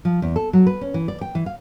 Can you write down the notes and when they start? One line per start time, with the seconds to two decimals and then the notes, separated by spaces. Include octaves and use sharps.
0.05 F3
0.22 E2
0.36 A4
0.53 F#3
0.67 B4
0.81 C#4
0.94 E3
1.08 D5
1.21 G5
1.35 E3
1.46 F5